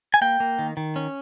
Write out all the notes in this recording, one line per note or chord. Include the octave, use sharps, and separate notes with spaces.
G#5
A#3 G5
A#3
D#3
D#3
C#4